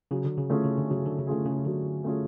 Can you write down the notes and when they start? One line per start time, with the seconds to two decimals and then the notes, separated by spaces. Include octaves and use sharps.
0.11 C#3 F#3
0.25 D3
0.38 C#3
0.50 D3 A3 C#4 F4 G#4
0.64 C#3
0.78 D3
0.89 C#3 F#3
1.06 D3
1.19 C#3
1.27 D3 A3 C#4 F4 G#4
1.45 C#3
1.66 D3 F#3
2.04 A3 C#4 F4 G#4